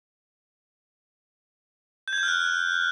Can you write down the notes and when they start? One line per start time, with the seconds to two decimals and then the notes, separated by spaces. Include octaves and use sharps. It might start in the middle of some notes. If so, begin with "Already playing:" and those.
2.08 G6
2.13 G#6
2.18 G6
2.23 F6
2.28 F#6